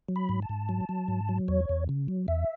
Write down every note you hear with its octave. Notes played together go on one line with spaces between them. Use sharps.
F#3
B5
G#2
A5
G#2
F#3
F#3
G#2
F#3
E2 C#5
E2
C#3
F#3
E2 E5